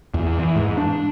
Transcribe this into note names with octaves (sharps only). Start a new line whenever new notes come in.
E2
E3
G#2
D4